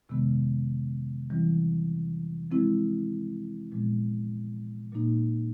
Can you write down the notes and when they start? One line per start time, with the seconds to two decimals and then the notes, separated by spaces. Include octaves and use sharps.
0.09 F2 C3 D#3 G#3 B3
1.30 E3 G3 C4 E4
2.51 F3 G#3 C4 E4
3.72 A#2 F3 G#3 B3
4.92 A#2 F#3 A#3 D#4